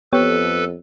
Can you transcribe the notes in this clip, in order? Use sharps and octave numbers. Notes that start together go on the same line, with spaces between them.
F2 B3 G4 A4 B4 C#5